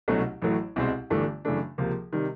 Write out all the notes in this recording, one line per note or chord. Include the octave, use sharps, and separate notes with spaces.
C2 B2 F#3 A3 C#4
A1 A2 F#3 A3
C2 B2 G#3 C4
G1 G2 E3 A3 D4
F#2 C#3 E3 A3 D4
C#2 C3 F3 A#3
C3 D#3 G3